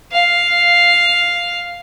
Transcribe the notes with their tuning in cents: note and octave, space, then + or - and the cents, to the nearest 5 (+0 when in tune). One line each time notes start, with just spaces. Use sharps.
F5 +0